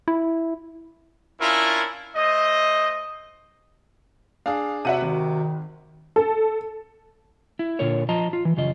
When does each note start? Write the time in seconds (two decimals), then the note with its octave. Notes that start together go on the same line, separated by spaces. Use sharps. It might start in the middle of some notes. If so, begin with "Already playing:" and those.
0.08 E4
1.41 C#4 D4 E4 F4 A#4
2.16 A3 C5 D#5
4.46 D4 G#4 F5
4.85 C3 F#4 E5 F#5 D#7
5.02 G#1 D#3
6.16 A4
7.59 E4
7.79 A#2 D3 F4 A#4 C#5
8.09 F3 F4 D#5 A5 A#5
8.33 F4
8.45 E3
8.57 F#2 C#3 F4 D#5